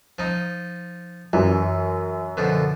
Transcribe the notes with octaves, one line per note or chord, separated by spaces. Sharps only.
F3 D#4
F#2 E3
B2 D3 F3